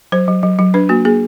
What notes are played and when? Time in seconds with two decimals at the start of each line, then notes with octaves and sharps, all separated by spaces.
0.12 F#3 C5
0.28 F#3
0.43 F#3
0.59 F#3
0.74 D4 B4
0.89 A#3 F#4
1.05 A#3 G#4